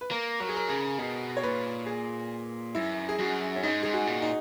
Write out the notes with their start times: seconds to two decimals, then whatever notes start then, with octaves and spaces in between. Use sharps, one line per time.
0.01 B4
0.11 A#3 A#4
0.40 F#3 A#4
0.49 G#4
0.56 A#4
0.69 C#3 G#4
0.98 B2 G#4
1.37 C#5
1.43 A#2 B4
1.86 G#4
2.75 F#2 E4
3.09 G#4
3.19 F#2 F#4
3.56 C#4
3.63 G#2 D#4
3.83 G#2 G#4
3.93 F#4
4.07 A#2
4.22 D#4